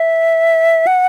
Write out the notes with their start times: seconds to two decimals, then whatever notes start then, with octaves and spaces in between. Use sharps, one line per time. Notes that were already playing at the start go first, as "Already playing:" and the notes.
Already playing: E5
0.87 F#5